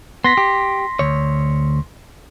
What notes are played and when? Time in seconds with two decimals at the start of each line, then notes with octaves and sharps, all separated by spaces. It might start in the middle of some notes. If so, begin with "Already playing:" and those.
0.24 B3 C6 A#6 B6
0.37 G4
0.99 D2 C#5